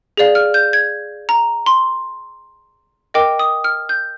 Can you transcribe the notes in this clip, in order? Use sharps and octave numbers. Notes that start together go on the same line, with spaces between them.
G#4 D5 F5
F6
G6
G#6
A#5
C6
A#4 D#5 G5 D6
D#6
F6
G6